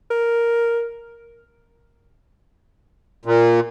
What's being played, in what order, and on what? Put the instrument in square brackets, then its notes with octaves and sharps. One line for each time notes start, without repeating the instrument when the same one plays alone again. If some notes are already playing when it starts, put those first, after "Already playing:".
[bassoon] A#4
[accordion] A#2